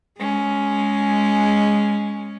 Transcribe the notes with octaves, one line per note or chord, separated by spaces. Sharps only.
G#3 C#4